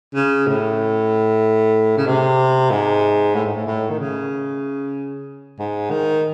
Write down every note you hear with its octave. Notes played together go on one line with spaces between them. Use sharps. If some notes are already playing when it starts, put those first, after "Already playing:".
C#3
A2
C#3
C3
G#2
A2
G#2
A2
A2
D#3
C#3
G#2
D#3